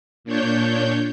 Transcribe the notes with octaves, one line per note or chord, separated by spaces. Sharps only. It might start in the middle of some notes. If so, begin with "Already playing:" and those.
A#2 D4 C#5 G6